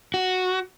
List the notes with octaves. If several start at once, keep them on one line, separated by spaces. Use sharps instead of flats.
F#4